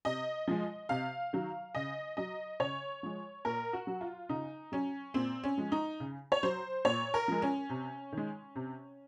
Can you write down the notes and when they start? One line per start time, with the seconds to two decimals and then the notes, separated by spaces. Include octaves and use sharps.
0.05 C3 D#5
0.47 F3 G#3
0.89 C3 F5
1.33 D#3 F#3
1.75 C#3 D#5
2.17 F#3 D#5
2.60 C#3 C#5
3.03 F3 G#3
3.45 A#2 A#4
3.73 F#4
3.87 F#3
4.01 F4
4.29 C#3 D#4
4.72 F#3 C#4
5.14 A#2 C4
5.44 C#4
5.58 F3 G#3
5.72 D#4
6.00 C#3
6.32 C#5
6.43 F#3 C5
6.85 A#2 C#5
7.14 A#4
7.28 F3 G#3
7.42 C#4
7.70 C3
8.12 D#3 G#3
8.56 C3